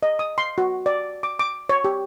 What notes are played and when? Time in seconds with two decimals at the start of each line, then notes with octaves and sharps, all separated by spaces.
0.03 D#5
0.19 D#6
0.38 C6
0.58 F#4
0.86 D5
1.23 D6
1.39 D6
1.69 C#5
1.84 G4